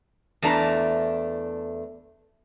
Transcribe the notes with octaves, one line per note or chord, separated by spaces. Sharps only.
E2 A3 D4 A#5